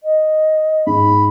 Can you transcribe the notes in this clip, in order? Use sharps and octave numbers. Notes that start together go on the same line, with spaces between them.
D#5
G#2 B5